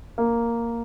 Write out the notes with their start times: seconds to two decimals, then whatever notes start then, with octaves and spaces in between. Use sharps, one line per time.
0.18 A#3